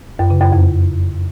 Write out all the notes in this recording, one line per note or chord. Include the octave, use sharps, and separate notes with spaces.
F#2
C#3
F#2
F2